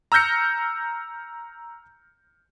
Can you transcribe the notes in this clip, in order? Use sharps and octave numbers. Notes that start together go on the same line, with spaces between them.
A#5 E6 F6 G6 A#6 C#7